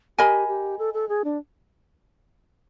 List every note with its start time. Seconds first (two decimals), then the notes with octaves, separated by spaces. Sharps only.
0.18 G4 A#4 D#5 G#5 B5
0.48 G4
0.79 A4
0.94 A4
1.09 G#4
1.24 D4